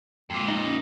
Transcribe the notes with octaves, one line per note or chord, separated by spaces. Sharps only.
F2 A#2 G#3
D#4
C#4